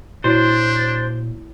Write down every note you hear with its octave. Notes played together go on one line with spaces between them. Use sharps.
A#2 A#3 D4 E4 F#4 C5 C#5